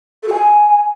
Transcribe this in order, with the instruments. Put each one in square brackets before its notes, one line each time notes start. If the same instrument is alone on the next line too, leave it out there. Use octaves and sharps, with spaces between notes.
[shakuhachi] A4
F#4
G#5